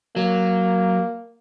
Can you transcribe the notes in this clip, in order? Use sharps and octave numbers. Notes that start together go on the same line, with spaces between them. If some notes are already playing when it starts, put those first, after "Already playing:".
F#3 A#3